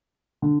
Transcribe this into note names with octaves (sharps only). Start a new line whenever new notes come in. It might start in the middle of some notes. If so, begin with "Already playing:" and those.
D3